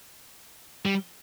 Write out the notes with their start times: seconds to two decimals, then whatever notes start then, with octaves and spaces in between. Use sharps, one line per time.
0.85 G3